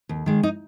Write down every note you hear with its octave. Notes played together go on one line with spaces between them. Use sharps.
D#2
D#3 G#3
D#4